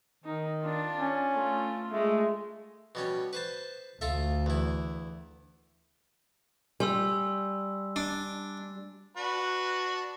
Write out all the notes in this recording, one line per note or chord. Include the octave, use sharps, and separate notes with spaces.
D#3 D#4
D4 F4
C#4
A3 F4
G#3 A3
B2 G3 C#4
B4 C5 A5
D2 F4 A4 E5
E2 E4
G3 G#5 C6 E6
D4
D4 F#4 B4